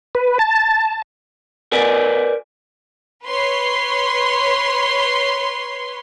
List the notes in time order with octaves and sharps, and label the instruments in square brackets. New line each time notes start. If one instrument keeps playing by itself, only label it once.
[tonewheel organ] B4
A5
[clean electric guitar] A#4 B4 D5 G#5
[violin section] B4 C#5 C6